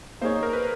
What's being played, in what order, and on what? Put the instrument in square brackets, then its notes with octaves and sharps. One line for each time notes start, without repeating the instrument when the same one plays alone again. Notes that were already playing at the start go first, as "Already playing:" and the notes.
[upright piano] A#3 D#4 G#4 C#5 [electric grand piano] C5
[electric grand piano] A#4
B4